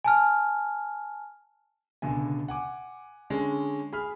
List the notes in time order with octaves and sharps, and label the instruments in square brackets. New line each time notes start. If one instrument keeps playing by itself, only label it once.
[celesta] G#5 A5 F6
[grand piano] C#2 B2 D3 G#5
F#5 G#5 D6
D3 G#3 C#4
G#4 B5 F6